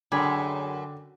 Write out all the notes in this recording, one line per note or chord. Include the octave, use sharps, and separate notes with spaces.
F#2 D3 G#4 G5 B5 D6